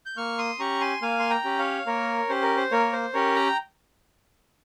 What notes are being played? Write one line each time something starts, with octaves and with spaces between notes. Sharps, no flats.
G6
A#3 C#6 F6
C6 D#6
C#4 G4 A#5 C#6
G#5 C6
A#3 F5 G#5
C6
G5 A#5
C#4 G4
C#5 F5
A#3 A#4 C#5
C#4 G4 C5
A#4
C5
A#3 A#4 C#5
C5
C#4 G4 A#4 C#5
G5 A#5